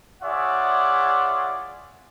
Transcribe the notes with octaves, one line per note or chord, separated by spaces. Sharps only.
F4 G#4 C#5 D5 E5 F#5